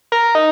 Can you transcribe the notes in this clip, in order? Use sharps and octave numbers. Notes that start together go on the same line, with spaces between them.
A#4
D#4